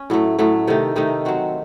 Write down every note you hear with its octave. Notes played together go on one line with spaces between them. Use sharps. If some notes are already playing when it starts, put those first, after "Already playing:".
Already playing: C#4
A2 F#3 A3
A2 F#3 A3
C3 D#3 A3 D#4
C3 D#3 A3 D#4
F#3 C4 F#4